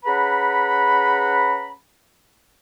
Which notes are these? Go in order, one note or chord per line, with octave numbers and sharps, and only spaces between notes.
C#4 G#4 B4 F#5 A#5 B5